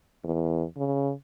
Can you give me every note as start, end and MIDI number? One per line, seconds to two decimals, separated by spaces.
0.24 0.65 40
0.77 1.12 49